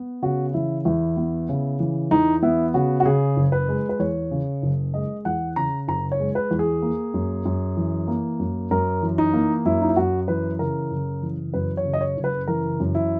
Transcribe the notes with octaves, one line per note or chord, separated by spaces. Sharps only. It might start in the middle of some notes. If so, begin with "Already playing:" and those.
Already playing: B3
C#3 F#4
E3 E4
E2 E4
B3
C#3
E3
E2 D#4
B3 E4
C#3 F#4
F#4
C#3 G#4
F#1
B4
G#3
B4
E2 C#5
C#3
F#1
G#3 D#5
E2 F#5
C#3 A#5
F#1 A#5
C#5
G#3
B4
E2
G#4
A#3
F#2
F#2
E3
A#3
F#2
F#2 A#4
E3
D#4
A#3
F#2 E4
D#4
E4
F#2 F#4
E3 B4
C#3 A#4
F#1
E3
F#2 B4
C#5
C#3
D#5
C#5
F#1
B4
E3 A#4
F#2
E4